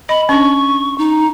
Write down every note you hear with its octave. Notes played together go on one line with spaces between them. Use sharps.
D#5 B5
C#4 D4 C#6
D#4